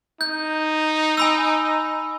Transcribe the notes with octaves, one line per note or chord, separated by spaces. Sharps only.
D#4 G6
G#5 B5 E6